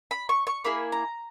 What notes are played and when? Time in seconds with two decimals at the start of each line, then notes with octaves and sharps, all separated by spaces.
0.11 B5
0.29 C#6
0.47 C#6
0.64 A#3 E4 G#4 B5
0.92 A#5